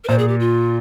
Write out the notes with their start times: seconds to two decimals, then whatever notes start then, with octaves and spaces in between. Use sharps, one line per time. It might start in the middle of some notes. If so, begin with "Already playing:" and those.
0.04 A#4
0.08 A#2 C5
0.19 G#4
0.28 G4
0.40 F4